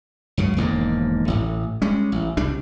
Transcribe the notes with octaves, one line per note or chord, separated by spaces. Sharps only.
C#2 F#2 C#3
E1 D#2 G#2 A#3
A1 A2
G3 G#3 C#4
A1
C2 C#3 G3 D4